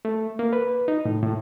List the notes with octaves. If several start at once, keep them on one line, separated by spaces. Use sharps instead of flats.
A3
A#3
B4
D#4
A2
A2